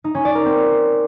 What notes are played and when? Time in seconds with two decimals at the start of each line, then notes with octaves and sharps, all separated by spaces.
0.04 D#4
0.15 C#4
0.25 D5
0.35 A#4
0.45 C4